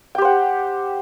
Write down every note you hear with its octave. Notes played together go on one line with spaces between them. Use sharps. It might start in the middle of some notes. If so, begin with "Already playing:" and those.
G4 C5 F#5 G5